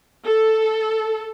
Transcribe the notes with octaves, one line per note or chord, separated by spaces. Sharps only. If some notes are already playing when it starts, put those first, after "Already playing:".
A4